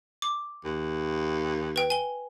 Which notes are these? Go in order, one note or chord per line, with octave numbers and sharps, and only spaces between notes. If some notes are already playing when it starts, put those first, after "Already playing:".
D6
D#2
B4 G5
G#5 G7